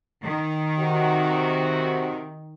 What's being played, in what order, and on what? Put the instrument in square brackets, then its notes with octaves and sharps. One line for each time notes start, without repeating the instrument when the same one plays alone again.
[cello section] D#3
[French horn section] C3 F#4